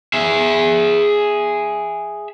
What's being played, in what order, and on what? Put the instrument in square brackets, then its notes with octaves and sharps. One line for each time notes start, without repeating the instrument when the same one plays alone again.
[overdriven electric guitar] G#4 E5